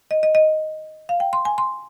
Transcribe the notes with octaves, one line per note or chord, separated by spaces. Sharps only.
D#5
D#5
D#5
F5
G5
C6
G#5
C6